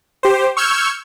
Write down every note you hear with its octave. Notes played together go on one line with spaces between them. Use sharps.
G4 C5
C#6 E6 F6 G6 G#6 C#7